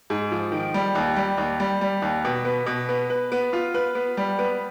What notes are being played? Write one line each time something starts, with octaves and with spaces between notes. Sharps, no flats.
G#2
F3
D#3
G3
D#2
G3
D#2
G3
G3
D#2
B2
B3
B2
B3
B4
B3
F4
B4
B3
G3
B3